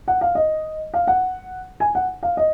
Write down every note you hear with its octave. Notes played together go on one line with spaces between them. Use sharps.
F#5
F5
D#5
F5
F#5
G#5
F#5
F5
D#5